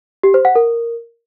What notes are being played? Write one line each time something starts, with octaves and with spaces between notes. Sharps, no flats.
G4
C5
F#5
A#4